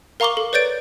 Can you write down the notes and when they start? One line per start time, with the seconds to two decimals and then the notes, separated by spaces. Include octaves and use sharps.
0.20 A#4 F5 A#5 C#6 D6 G7
0.37 A4
0.53 B4 C#5 D5 G6 A6 D7